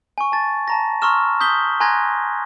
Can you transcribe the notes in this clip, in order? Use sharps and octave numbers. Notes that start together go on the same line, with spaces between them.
G#5 C#6
A5 A6
A5 A#5 A#6
A#5 C6 C#6 E6 F6 E7
D#6 G6 B6 G7
G#5 A#5 C6 F#6 G#6 A#6